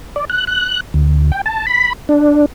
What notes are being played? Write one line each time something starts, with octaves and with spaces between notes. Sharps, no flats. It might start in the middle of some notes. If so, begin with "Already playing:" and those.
D5
F#6
F#6
D2
G5
A5
B5
D4